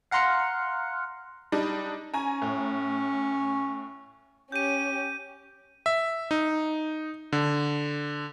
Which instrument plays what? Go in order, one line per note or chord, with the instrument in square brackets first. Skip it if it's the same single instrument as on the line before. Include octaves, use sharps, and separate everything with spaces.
[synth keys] F5 F#5 A#5 C6 F6 C#7
[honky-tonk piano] G3 D4 D#4
[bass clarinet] C#4 [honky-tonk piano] G#5 A#5
[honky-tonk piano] A2
[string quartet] C#4 G4 [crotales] G6 D#7
[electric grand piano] E5
D#4
D3